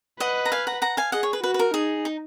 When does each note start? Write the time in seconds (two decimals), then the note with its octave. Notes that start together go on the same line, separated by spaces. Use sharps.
0.20 B4 D#5 F#5
0.45 A#5
0.52 F5 G#5
0.67 F#5 A#5
0.82 F#5 A#5
0.97 F5 G#5
1.12 G#4 D#5 F#5
1.23 C#5
1.33 B4
1.43 F#4 B4
1.54 B4
1.59 A#4
1.74 D#4 G#4
2.05 D#4